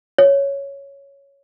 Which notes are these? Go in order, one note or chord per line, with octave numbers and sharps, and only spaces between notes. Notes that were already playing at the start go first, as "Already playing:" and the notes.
C#5